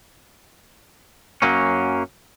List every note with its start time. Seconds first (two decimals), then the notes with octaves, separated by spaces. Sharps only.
1.42 F#2 F#3 A#3 C#4